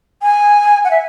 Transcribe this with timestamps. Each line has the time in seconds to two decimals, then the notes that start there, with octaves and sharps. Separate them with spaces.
0.22 G#5
0.84 F#5
0.91 E5